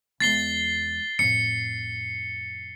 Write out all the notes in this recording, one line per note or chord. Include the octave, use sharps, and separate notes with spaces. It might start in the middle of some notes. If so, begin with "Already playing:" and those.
E2 G#3 A6 C7 G7
F2 A2 C#7